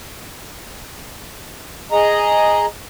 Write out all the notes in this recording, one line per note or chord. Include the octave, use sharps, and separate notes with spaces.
G#4 D#5 A#5